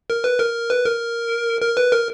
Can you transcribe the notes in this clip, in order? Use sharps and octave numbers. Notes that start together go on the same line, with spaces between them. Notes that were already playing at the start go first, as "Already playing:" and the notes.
A#4
B4
A#4
B4
A#4
A#4
B4
A#4